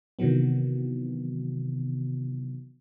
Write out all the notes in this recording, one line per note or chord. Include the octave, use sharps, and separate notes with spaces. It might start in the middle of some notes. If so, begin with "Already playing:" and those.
C3 D#3 E3 F#3 B3